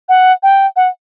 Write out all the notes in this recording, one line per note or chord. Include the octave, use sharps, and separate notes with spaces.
F#5
G5
F#5